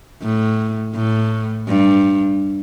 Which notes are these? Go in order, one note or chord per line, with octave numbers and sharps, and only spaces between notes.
A2
A2
G2